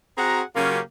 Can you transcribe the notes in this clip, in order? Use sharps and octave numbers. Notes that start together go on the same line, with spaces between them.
C4 F#4 G#4 F#5 A#5
C#3 F#3 A#3 C#4 F4 G4